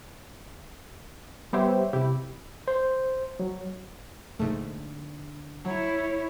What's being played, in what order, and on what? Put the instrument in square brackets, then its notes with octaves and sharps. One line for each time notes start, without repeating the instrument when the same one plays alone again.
[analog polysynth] G3 B3 G4 C5 C#5 E5
C3 E4 G4
[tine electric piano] C5
F#3
[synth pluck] A#1 G#2 A3 [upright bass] D3
[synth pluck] F#3 [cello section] E4 [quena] C#5